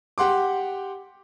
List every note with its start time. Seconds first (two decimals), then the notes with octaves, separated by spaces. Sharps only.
0.18 G4 F#5 C6 D6